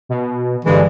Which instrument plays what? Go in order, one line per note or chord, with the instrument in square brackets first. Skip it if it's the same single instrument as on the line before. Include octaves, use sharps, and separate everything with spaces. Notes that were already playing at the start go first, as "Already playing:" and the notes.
[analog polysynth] B2
[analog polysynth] G2 D3 G#3 [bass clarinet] E3